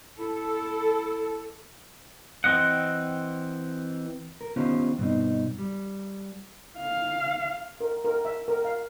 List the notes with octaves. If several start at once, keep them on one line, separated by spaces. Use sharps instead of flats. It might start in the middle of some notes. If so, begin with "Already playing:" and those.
E4 A4
E3 C4 D#5 F#5
A#4
D#3 B3 C#4 F4 G4 C5
G2 B2 C4 D#4
G3
F5
A#4
A#4
E5
A#4
F5